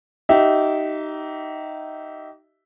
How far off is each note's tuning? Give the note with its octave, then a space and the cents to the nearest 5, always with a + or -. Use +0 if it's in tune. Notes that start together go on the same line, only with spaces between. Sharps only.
D#4 +0 G4 -30 E5 +0